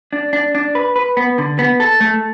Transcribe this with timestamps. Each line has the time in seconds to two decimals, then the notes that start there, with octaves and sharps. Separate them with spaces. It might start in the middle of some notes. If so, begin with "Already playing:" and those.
0.13 D4
0.33 D4
0.55 D4
0.75 B4
0.96 B4
1.17 B3
1.38 D3
1.59 B3
1.80 A4
2.00 A3